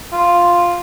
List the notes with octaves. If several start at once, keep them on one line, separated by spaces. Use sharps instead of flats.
F4